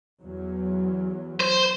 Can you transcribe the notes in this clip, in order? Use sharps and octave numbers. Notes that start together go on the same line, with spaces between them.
E2 F#3
C5